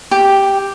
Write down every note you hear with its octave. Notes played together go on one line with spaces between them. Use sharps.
G4